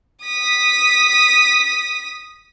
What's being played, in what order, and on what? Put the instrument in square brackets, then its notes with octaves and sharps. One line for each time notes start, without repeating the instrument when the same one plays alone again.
[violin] D#6 B6